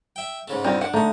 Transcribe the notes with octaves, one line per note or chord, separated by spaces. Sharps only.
E5 G5
G#2 C#3 A3
G2 B2 F3 C4 D4 D#4
D4 F#5
D3 A3 D#4 D#6